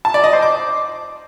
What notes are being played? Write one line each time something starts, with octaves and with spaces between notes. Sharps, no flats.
A5
D5
D#5
C5
D6